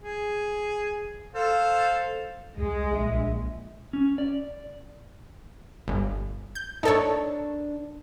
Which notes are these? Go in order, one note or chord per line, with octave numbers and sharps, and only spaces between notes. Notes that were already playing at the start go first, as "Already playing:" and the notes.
G#4
A4 C5 F5
C2 G#3 G#4
A#1 E5
C#4
D5
G1
G6
D4 D#4 A4 A#4 C#5 A5